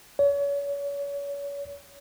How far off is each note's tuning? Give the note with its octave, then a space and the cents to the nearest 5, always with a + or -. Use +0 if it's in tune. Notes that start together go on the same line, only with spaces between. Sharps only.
C#5 +35